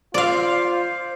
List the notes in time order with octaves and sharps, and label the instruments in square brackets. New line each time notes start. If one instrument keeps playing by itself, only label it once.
[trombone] F4 [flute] C5 [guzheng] D5 F5